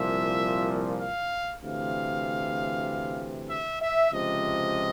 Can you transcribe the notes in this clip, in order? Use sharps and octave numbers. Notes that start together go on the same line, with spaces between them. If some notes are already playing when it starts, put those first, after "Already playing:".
Already playing: C2 A#2 F3 E5
F5
D2 C3 E3 F5
E5
E5
C#2 C3 F3 D#5